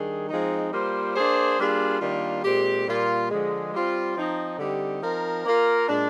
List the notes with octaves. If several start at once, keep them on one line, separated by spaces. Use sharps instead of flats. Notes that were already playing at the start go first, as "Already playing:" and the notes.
Already playing: D#3 G3 D4 G#4
F3 G#3 C4 D#4
G3 A#3 F4 C5
A#3 D4 G#4 C5
G3 A#3 D4 F4 G#4
D#3 G3 A#3 D4 F4
A#2 G#3 C4 G4
A#2 G3 A#3 F4
D3 F3 G#3
G3 C4 F4
F3 C4 D#4
D3 G3 C4 D#4 G4
F3 C4 D#4 A#4
A#3 F4 A#4
A#2 G#3 D4